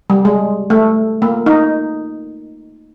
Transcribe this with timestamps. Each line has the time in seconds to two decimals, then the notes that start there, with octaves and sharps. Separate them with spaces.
0.10 G3
0.25 G#3
0.70 A3
1.22 A#3
1.46 D#4